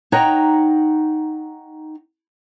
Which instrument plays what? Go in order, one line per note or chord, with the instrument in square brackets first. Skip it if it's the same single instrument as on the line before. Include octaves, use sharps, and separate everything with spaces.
[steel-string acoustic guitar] D#4 C#5 F#5 G5 A#5